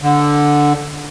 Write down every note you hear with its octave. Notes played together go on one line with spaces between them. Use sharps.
D3